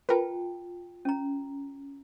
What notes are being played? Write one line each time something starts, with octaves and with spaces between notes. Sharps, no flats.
F4 A#4 B4 G5 A5
C#4 A#5